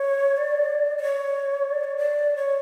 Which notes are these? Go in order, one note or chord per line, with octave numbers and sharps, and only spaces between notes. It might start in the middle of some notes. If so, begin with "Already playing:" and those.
Already playing: C#5
D5
D5
C#5
D5
C#5
D5
C#5